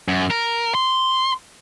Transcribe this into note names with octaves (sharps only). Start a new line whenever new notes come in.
F#2
A#4
C6